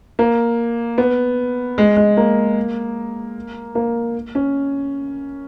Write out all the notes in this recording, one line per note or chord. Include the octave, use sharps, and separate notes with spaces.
A#3
B3
G#3
G#3
A#3
A#3
C#4